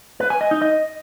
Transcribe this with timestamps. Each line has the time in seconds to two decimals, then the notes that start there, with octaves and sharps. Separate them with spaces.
0.20 B4
0.30 G#5
0.41 D#5
0.51 D#4
0.62 D#5